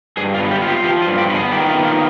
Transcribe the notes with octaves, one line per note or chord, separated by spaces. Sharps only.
G2 G#4
F4
B3
G4
F4
G4
F3 G4
F4
G2
G4
B3 B4
G#4
D#3 G4
F4
B3
F4